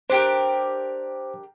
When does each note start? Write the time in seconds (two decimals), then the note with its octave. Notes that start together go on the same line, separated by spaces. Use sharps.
0.10 D4 G4 A#4 C5